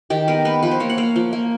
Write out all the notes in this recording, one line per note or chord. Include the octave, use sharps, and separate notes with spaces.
D#3 G4
B3 A#4
B3 B4
F3 B4
C5
A#3 C#5
F#5
A#3 F5
F3
A#3